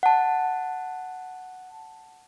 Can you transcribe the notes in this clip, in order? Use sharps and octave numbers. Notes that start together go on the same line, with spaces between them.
F#5 A5